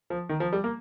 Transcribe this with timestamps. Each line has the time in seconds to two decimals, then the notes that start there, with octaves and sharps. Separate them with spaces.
0.10 F3
0.29 D#3
0.40 F3
0.53 G3
0.64 A#3